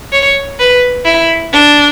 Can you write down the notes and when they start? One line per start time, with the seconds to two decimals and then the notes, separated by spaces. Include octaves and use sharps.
0.13 C#5
0.59 B4
1.05 E4
1.53 D4